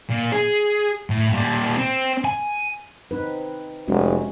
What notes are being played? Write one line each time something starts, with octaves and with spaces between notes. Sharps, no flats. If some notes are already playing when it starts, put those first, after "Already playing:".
A#2
G#4
A2
A#2 G3
C4
G#5
C4 D#4 B4
F1 G#3 C#4 F#4